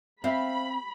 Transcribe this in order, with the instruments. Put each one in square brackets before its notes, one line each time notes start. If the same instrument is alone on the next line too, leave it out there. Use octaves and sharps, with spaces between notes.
[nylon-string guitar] C4 [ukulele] C5 E5 F5 [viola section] B5